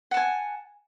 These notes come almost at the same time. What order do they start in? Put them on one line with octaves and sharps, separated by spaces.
F#5 A5 G#5